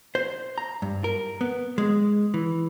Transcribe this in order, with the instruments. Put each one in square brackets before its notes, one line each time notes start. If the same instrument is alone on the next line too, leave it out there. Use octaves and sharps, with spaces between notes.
[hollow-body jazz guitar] C5
A#5
G2
A#4
B3
G#3
E3